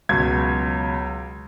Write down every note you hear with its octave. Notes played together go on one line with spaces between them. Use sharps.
C#2 B2 F#3 G#6